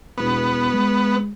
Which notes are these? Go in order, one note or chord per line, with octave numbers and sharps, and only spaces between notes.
E1 B3
G#3